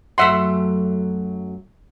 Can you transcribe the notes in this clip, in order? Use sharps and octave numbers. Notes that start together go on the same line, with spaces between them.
F#2 F#3 A3 E5 F#5 C6